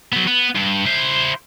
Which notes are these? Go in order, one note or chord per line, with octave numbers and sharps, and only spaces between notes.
F#3 B3
B3
G2
E4 C5